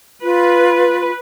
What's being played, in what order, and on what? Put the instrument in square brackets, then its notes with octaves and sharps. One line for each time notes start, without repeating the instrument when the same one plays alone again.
[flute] F4 [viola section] B4